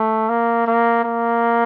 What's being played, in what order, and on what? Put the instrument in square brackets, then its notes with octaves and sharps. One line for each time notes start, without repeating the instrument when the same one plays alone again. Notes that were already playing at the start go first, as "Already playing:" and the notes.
Already playing: [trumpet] A3
A#3
A#3
A#3